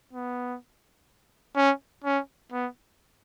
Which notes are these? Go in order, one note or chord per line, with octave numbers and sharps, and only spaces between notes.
B3
C#4
C#4
B3